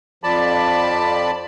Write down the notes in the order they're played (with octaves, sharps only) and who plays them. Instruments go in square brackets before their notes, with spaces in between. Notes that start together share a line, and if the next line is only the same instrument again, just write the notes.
[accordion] F2 F3 D5 A5 B5